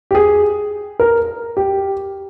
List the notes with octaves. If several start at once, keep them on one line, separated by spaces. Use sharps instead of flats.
G4
G#4
A#4
G4